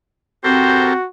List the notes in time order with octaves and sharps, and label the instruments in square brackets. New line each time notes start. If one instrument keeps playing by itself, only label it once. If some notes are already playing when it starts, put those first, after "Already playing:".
[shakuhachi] C4 [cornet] F#4 [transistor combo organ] G4 A4 A#4 [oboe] C5